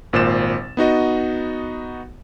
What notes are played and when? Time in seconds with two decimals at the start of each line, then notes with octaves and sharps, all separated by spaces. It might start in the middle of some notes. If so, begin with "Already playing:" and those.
0.13 G#1 A#2 C5 A6 E7
0.77 B3 D#4 F#4 D#5